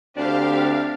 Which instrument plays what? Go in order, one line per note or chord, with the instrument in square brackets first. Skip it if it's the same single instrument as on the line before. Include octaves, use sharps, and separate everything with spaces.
[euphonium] D2 [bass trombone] C4 [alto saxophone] D4 [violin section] G4 F5